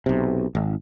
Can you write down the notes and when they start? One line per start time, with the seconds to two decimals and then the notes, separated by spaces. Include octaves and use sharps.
0.06 B1 C3
0.55 G#1